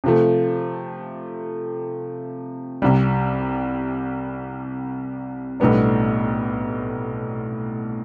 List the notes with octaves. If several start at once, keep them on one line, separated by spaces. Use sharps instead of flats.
C3 F3 A3
C2 C3 G3
B1 A2 G3 B3 D4